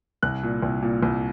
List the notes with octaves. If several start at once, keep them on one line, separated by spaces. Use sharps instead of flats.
C2 F#6
A#2
C2
A#2
C2